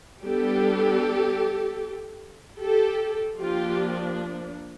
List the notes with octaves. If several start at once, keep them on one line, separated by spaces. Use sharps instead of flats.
G3 B3 D4 G4 A4
G4 A4
F3 A#3 D4 F4 G4